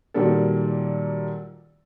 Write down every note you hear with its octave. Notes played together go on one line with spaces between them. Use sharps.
A#2 D#3 F#3 G3 A#3 A4